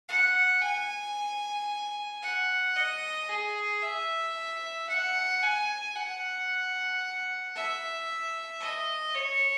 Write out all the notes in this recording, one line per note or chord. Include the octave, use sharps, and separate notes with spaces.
F#5
G#5
F#5
D#5
G#4
E5
F#5
G#5
F#5
E5
D#5
C#5